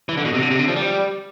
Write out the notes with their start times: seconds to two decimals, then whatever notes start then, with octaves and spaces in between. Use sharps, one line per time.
0.09 E3
0.17 D3
0.25 B2
0.34 C3
0.42 D3
0.51 C3
0.59 D3
0.68 F3
0.76 G3